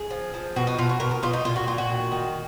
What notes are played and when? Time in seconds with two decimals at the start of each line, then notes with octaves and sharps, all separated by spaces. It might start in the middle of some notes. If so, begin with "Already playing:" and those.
Already playing: G#4
0.10 F3
0.34 F3
0.56 B2 F#4
0.67 D#4
0.78 B2 F4
0.89 F#4
1.00 B2 A#4
1.11 A#4
1.23 B2 F4
1.33 D#4
1.45 A#2 F4
1.56 F#4
1.67 A#2 F4
1.78 F#4
1.90 D#3
2.12 D#3